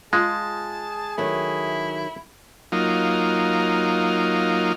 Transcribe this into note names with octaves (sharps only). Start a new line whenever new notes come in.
G#3 F4 G#4 A5
D#3 F#3 A3 E4
F#3 A#3 D#4 F4